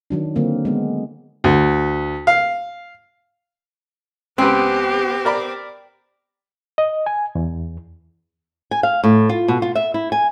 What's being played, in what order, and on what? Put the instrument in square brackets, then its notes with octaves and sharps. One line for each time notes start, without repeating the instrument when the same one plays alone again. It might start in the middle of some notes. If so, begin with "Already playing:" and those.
[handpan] D#3 F#3 D4
D3 F#3 A#3 C4
G#3 B3
[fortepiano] D2
F5
[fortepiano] C#2 B4 [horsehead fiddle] B3 G4 [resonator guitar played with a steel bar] C4
[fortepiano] A#4 D5 B5
[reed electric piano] D#5
G#5
E2
[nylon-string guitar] G#5
F5
A2
F4
B2
F4
E5
E4
G#5